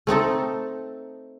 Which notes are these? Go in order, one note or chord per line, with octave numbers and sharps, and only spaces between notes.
A3 C4 D#4 A4